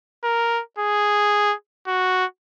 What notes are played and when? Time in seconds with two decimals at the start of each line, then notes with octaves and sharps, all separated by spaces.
0.24 A#4
0.79 G#4
1.87 F#4